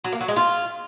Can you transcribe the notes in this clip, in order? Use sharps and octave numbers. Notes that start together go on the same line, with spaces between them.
F#3
A#3
F#3
G#3
F4